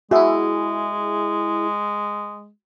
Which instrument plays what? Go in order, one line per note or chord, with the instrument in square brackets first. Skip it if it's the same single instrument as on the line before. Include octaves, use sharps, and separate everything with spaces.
[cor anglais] G#3 [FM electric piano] E4 G#4 [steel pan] F#4 E5